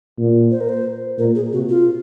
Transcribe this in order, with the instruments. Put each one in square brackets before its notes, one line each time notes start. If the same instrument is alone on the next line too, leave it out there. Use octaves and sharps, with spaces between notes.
[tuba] A#2
[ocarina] C5
A#4
C5
[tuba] A#2 [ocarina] A#4
[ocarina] G#4
[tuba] C3 [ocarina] F#4
[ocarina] F4